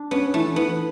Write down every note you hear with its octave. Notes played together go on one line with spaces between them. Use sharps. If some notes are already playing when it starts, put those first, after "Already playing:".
Already playing: D4
B3 C#4
E3 A3
E3 B3